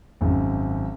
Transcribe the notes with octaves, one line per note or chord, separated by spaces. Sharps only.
G#1 F#2